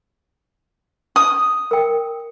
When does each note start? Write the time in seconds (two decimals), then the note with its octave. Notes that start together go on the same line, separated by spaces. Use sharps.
1.16 D#6
1.71 A#4 G5